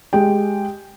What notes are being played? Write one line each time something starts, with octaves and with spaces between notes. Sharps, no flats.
G#3 G4 G5